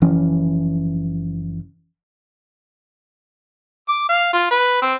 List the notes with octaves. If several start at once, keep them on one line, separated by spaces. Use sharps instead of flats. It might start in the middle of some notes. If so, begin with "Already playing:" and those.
F#1 E3 F3 C#4
D6
F5
F4
B4
C4